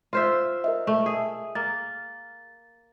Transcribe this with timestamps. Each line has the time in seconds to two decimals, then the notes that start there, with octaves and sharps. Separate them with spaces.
0.13 F4 C5 E5
0.64 A#4 D#5 E5
0.87 A3
1.06 G#4
1.55 A#3 A6